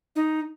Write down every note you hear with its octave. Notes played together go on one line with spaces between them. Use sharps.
D#4